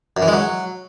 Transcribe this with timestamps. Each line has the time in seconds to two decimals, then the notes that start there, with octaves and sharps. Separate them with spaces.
0.17 F#2
0.22 E3
0.28 G#3
0.33 F#3